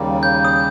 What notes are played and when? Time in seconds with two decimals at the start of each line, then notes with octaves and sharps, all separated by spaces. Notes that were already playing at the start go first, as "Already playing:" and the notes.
Already playing: D#2 C#3 G3 A#3
0.23 G6
0.45 D#6